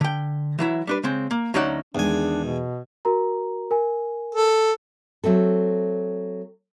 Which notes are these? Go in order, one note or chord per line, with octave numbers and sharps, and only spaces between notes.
D3 G5
E3 F#3 E4
G3 D4 B4
C#3 G#3 C4
A#3
D2 F#3 C#4 D#4 D5 F#5
E2 D#3 G#3 D4 G#5
B2
F#4 A#4 A#5
A#4 G#5
A4
F#3 A3 C4 A4